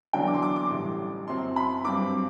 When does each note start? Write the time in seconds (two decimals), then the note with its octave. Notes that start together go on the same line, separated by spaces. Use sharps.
0.13 E2 D3 F#3 B3 D4 G5
0.28 D6
0.35 C6
0.42 D6
0.56 D6
0.70 A1 A2 G3
1.28 F#2 F#3 C4 C6
1.56 B5
1.85 G2 F#3 C4 D6